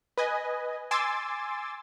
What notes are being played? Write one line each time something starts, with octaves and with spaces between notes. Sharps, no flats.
B4 D#5 G#5
G#5 C6 D6 E6 A6